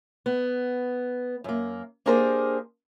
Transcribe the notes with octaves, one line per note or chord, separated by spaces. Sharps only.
B3
F#2 A#3
A#3 D4 G4 G#4 A#4 C5